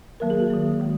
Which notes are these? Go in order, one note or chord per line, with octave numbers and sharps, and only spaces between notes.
D#3 F#3 A#3 A#4
G#4
F#4
D#3 F#3 A#3
D#3 G#3